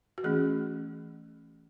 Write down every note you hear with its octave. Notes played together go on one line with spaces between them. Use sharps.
F#4
E3 A3 C#4 G#4